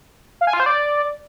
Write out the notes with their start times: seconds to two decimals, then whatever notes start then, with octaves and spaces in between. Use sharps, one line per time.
0.41 F5
0.47 G#5
0.54 F4
0.60 C5
0.66 D5